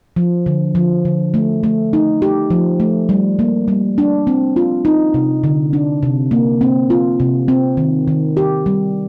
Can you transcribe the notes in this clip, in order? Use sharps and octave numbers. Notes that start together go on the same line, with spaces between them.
F3
D3
F3
D3
A3
A3
D#4
G4
F3
A3
G3
A#3
G3
D4
C4
F4
D#4
C3
D3
D4
C3
A#3
C4
F4
C3
C4
D#3
D#3
G4
G3